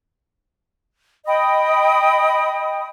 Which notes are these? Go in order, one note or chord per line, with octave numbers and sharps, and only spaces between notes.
D#5 G5 B5 D#6